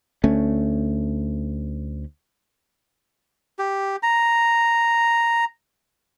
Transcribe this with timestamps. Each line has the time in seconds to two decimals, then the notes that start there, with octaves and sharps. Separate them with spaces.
0.24 D2 A3 C#4
3.59 G4
4.03 A#5